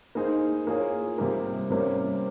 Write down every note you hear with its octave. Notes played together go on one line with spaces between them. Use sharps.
A#3 D#4 G#4 C5
A#3 F4 G#4 C#5
C3 G3 A#3
C3 G3 A#3 C#4